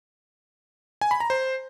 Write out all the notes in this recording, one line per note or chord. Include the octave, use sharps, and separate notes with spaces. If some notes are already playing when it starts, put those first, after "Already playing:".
G#5
B5
A#5
C5